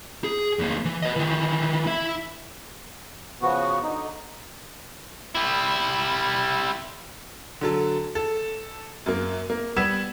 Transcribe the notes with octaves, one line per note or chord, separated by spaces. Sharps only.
G#4
E2 A#3
E3
B4 D#5
D#3 E3
E4 E5
C#3 F3 B3 F#4
D3 D#4
G3 E4
D3 F#3 A4
A4
F#2 A#3
A#3
G3 B3 E6 G#6 E7